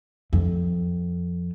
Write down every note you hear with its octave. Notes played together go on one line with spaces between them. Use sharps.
F2